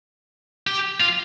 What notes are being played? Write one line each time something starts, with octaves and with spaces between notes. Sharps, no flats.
G4
F4